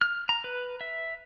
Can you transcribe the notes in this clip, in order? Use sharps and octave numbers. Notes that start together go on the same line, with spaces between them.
F6
A#5
B4
E5